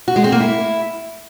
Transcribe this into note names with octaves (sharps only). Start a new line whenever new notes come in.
F#4
G#3
C4
A#3
E4